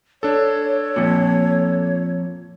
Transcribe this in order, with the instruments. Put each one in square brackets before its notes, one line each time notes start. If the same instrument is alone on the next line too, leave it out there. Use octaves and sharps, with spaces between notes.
[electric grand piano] D4 A4 [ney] C#5
[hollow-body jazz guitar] F2 A#2